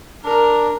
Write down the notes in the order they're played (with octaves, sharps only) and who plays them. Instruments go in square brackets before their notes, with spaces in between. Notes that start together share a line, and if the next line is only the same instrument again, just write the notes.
[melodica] D4 [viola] A#4